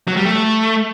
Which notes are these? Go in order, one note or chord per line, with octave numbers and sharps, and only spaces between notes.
F#3
G3
A3